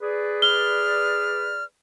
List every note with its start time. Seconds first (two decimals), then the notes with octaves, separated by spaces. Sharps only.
0.01 G#4 B4 D5
0.42 F6 G7